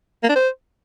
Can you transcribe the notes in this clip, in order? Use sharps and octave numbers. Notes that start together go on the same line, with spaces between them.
A#3
D4
C5